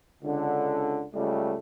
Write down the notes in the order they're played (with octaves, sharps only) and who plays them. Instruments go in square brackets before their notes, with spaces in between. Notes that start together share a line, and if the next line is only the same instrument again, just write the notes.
[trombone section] C#2 D3
C#2 G3 A3